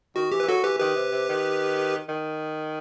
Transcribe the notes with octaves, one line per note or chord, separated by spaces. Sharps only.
D#3 F#4
E3 G4
B4
E3
F#3 F#4 A4
E3 G4 B4
D#3 G4 B4
C3
C3
D#3
D#3